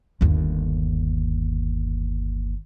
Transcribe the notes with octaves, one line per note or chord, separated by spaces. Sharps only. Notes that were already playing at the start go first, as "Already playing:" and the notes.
G1 D#2